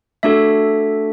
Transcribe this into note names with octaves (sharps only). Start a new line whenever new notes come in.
A3 D4 F#4 A4 E5